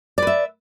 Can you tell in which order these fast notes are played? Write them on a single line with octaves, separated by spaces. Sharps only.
D5 B4 E5